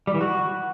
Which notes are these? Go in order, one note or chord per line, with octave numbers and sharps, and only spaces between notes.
G3
E3
F#4